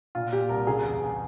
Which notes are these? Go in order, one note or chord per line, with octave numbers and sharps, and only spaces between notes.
A#2 F4
A#2 G4
C2 A#4
C#3 G#4
E2
E2